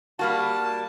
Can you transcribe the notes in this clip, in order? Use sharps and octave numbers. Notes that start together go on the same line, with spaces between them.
G3 A#3 F#4 A5